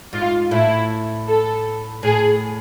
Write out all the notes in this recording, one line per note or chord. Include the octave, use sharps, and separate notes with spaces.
G#2 F4
A2 E4
A4
A2 G#4